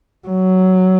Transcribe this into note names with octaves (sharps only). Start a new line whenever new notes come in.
F#3